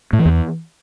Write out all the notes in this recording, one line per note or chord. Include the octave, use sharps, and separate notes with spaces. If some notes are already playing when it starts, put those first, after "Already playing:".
A2
E3
E2